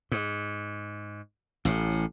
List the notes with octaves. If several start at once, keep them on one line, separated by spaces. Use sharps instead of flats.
G#2
A1 A2